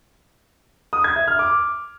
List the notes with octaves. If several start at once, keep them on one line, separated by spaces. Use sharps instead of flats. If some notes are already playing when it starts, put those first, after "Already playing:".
D#6
G#6
E5
F6
D6